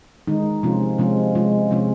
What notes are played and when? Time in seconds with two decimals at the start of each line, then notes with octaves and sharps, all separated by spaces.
0.28 D#3 G#3 D#4
0.63 C3 F3 G#3 C#4 F4
0.99 C3 F3 G#3 C#4 F4
1.35 C3 F3 G#3 C#4 F4
1.71 C3 F3 G#3 C#4 F4